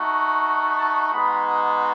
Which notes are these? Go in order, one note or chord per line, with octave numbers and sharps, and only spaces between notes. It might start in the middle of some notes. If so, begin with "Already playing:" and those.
Already playing: A3 D#4 F#4
A5
G#3 B3 D#4 F#4 B5